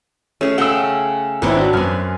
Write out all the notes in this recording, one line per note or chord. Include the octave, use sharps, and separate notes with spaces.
A3 C#4 G#4
C#3 A3 F#5 G5 E6
G#1 B3 C4 E4 C#5
D4 F#4
F#2 B3 G#5 F6